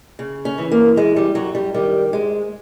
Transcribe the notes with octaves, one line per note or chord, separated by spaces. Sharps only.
C#3
C#4
E3
A#3
F#2 G#3
G3
F#2 F#3
G3
D#3 G3
G#2 G#3